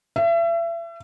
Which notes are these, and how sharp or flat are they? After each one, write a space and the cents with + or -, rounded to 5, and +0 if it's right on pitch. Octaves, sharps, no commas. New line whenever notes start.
E5 +35